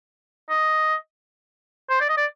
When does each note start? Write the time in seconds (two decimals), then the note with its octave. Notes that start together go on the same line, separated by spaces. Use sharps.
0.50 D#5
1.90 C5
2.00 D5
2.09 D#5
2.17 D5